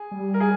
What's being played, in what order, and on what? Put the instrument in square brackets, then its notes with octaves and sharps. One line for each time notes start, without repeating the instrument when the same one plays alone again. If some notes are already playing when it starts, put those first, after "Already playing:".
Already playing: [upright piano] G#4
[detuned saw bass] G3
[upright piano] A#4
G#4